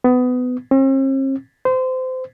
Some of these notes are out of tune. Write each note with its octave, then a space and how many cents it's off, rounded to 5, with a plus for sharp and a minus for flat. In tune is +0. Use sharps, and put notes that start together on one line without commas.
B3 +20
C4 +45
C5 -25